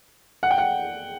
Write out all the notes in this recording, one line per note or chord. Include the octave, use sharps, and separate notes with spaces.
F#5
G5
F#5